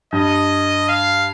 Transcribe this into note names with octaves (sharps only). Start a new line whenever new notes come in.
G2 D#5
F5